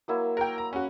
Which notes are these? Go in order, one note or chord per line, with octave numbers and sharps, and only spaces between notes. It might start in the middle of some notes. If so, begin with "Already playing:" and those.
F#3 A#3 E4
A#4 G5
A#5
C#4 F#4